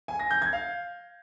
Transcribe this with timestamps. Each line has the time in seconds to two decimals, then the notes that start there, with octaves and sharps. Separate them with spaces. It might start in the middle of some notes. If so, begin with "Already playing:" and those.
0.08 G#5
0.19 A#6
0.31 G6
0.42 G#6
0.53 F5